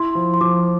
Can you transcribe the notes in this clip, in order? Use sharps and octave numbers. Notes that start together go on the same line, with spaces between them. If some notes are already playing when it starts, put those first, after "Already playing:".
Already playing: E4 C6
F3
C6
F3 D6